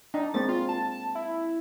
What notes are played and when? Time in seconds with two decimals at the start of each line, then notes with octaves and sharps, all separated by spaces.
0.14 D4 D#4
0.34 G#3 A#3 C4 A6
0.49 F4
0.69 A5
1.15 E4